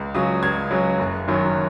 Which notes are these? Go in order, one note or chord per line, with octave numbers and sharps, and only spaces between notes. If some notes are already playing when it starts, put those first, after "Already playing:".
Already playing: C#2
C#3 F#3 D#6
C#2 G#6
C#3 F#3
F#1
F#2 D#3 F#3